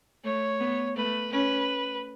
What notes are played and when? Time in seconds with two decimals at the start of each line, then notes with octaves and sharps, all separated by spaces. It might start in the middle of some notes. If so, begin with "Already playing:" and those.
0.24 A3 C#5
0.60 B3
0.96 A3 B4
1.31 C#4 B4